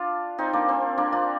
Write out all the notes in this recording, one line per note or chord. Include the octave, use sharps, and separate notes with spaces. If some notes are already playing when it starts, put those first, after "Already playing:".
Already playing: D4 F4
C4 D#4
A#3 D4
C4
A#3 D4
D4 F4